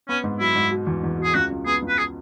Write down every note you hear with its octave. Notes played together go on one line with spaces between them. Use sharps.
B3 C#4
G#2
F#3 E4
G#2
B2
E2
E2
B2 G#4
C#2 F#4
C#2
B3 G#4
C#2
B4
G#4